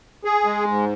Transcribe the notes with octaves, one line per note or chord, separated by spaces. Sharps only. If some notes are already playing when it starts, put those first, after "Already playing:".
G#4
G#3
G#2